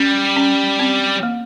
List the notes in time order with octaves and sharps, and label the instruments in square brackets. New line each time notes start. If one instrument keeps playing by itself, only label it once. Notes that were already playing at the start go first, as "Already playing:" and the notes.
Already playing: [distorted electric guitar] G3 [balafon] C#4
[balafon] C#4
C4
A#3